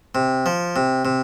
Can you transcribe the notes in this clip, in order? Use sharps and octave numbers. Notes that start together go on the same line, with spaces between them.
C3
F3
C3
C3